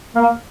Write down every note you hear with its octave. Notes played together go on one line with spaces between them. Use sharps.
A#3